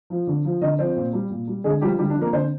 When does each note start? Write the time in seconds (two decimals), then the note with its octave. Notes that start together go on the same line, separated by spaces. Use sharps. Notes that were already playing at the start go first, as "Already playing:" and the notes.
0.10 F3
0.27 D3
0.45 F3
0.61 D3 D#4 D#5
0.79 F3 C4 C5
0.96 A#2
1.13 G3
1.30 A#2
1.48 G3
1.64 D3 G#3 G#4
1.81 F3 G3 G4
1.98 D3 G3 G4
2.10 D4
2.16 F3
2.21 A#3 A#4
2.33 D3 C4 C5